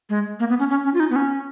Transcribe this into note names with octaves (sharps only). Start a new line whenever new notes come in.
G#3
A#3
B3
C#4
C#4
C#4
F4
D#4
B3
C#4